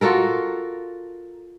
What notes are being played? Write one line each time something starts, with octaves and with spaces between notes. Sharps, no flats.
F4 F#4 A4 A#4